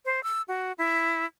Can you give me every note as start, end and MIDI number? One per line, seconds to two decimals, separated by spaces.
0.05 0.23 72
0.23 0.42 88
0.48 0.72 66
0.78 1.25 64